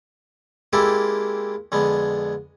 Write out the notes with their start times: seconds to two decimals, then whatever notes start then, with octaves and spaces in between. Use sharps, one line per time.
0.73 G#3 A#3 C4 E4 G4 A4
1.72 F2 D3 G#3 B3